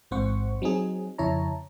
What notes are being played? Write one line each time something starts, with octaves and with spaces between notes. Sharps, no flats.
A1 G#2 C4 C5 F#5 C#6
F#3 C4 D#4 G#4
F2 C#3 E4 C#5 A5 A#5